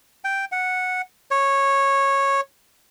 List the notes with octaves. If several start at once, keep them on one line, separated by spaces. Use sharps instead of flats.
G5
F#5
C#5